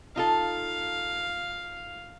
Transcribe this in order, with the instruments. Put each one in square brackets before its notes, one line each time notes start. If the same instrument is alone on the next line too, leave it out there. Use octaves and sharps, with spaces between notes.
[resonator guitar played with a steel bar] D#4 F4 A4 [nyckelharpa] F5